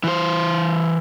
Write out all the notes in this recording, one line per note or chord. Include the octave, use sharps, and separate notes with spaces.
E3 C5